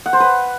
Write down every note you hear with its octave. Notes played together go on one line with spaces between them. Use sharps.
F#5
C5
B4